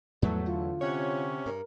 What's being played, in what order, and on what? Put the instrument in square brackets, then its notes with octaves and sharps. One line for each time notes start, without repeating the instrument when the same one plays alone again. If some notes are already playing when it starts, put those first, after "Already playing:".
[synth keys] E2 F#3 A3 [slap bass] G#2 F3 B3
[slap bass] D3 [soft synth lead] F4
[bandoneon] C3 C#4 [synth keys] C#5 F#5
[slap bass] G2 [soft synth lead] A#4